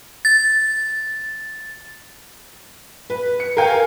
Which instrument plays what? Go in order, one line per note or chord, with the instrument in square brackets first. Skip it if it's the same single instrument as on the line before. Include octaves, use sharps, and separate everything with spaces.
[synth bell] A6
[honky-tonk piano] B4
C#7
A#4 F5 G5 G#5